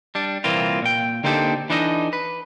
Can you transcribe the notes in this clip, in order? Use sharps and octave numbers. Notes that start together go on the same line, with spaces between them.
G3 D4
C2 A#2 E3 A#3 C4 F4
A#2 G5
D3 A#3 C4 D#4 G4 A4
E3 D4 D#4 A4 B4 D#5
B4